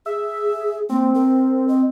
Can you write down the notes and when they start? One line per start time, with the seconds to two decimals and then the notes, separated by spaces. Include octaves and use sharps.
0.06 G#4 E5
0.89 A#3 C4
1.14 A#4
1.68 D#5